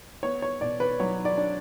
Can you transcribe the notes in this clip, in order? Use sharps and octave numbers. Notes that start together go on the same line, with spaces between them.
B3 C#5
C#5
B2 D5
B4
F#3 C#5
D5
D4